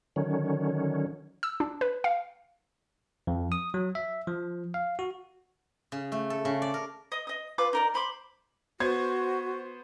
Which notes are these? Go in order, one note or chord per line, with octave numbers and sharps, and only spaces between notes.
D3 D#3 F#3 C#4
E6
D4
B4
F5
F2
D#6
F#3
E5
F3
F5
F#4
C#3
A3
A4
C#3
D5
A#4
D#5 D#6
D#5 D#6
F4 B4 D6
D#4 A#4 D5
C5 B5 C6 D6
B3 F#4 C5 G#6